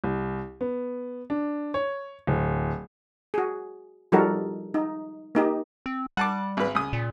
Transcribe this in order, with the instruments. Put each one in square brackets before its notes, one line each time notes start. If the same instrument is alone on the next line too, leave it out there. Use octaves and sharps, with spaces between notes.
[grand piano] C2
B3
D4
C#5
D1
[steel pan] F#4 G#4
F3 G3 D#4 F#4 A4 A#4
D#4
A#3 D#4 G4
[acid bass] C4
[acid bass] G3 [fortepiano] F#5 A5 D6
[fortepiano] G#1 B4
C#2 D#6
[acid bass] A#2